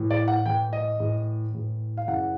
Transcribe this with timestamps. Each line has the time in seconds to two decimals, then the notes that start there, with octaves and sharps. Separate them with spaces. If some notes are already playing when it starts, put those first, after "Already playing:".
Already playing: A2 E3
0.11 D5
0.28 F#5
0.46 A2 E3 G5
0.73 D#5
1.00 A2 E3
1.54 A2 E3
1.97 F5
2.08 F#2 C#3 E3 F#5